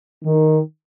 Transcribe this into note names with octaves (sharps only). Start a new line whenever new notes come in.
D#3